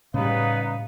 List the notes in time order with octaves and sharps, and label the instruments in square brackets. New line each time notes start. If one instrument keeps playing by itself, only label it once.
[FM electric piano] A2 [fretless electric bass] C#3 G3 [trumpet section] B3 D#4 B4 [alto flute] F5